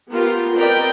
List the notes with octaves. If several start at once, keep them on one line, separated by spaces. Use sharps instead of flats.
B3 F4 G4 A#4 C6
C4 A#4 B4 D5 D#5 G5